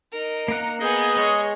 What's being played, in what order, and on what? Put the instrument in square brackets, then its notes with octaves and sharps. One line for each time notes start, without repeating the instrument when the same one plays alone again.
[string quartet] D#4 A#4
[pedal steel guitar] A#3 F#5
[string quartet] B3 G#5 G6 [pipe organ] G#4 D#5
[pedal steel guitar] G#3 [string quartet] C#5